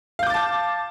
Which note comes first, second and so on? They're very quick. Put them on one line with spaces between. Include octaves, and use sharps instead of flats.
F5 G6 D6 A6 A5